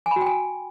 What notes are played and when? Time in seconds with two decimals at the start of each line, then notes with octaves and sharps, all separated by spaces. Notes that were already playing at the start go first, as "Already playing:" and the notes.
0.06 G#5
0.11 B5
0.16 F#4
0.21 G5
0.26 G#5